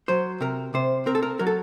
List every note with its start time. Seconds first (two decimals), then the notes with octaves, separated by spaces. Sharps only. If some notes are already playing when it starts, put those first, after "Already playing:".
0.08 F#3 C5
0.41 C3 A#4
0.74 C3 C5
1.06 C4 A#4
1.15 A4
1.23 A#4
1.39 F#3 A#4
1.47 A4